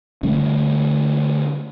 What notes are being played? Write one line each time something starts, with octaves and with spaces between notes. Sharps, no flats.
D3 G3 A3 C#4